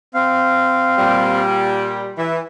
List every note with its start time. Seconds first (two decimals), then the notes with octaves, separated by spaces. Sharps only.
0.14 C4 F5
0.98 A#2 G3
2.18 E3 E5